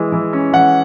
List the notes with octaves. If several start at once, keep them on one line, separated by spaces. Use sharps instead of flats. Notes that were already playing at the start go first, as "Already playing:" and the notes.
Already playing: E3 G#3
E3
C#4
E3 F#5